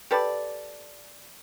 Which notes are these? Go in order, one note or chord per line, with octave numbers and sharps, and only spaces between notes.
G4 A4 B4 D5